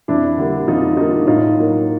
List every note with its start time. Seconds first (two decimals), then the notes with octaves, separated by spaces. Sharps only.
0.08 F2 D4 E4
0.38 D3 G3 A#3
0.67 F2 D#4 F4
0.97 D3 G3 A#3 D#4 F4
1.27 A2 D#4 F4
1.57 F#3 A#3